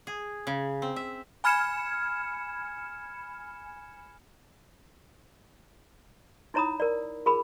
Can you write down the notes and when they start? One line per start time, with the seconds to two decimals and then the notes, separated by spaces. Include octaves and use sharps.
0.07 G#4
0.47 C#3
0.82 C4
0.96 E5
1.44 G#5 B5 F6 G#6 C#7 E7
6.54 D#4 E4 C#5 A#5 B5 D#6
6.80 A#4 D5
7.26 F4 G#4 A#4 B5